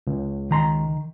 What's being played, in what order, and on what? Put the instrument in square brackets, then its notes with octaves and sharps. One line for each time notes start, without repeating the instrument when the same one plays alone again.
[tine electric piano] C#2
[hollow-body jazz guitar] D#3 A#5 C6